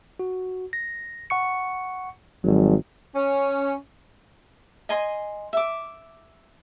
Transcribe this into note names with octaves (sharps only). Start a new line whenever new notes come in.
F#4
A#6
F#5 C#6 C#7
G#1 F#3 G3
C#4
D#5 G#5 C6
E5 D6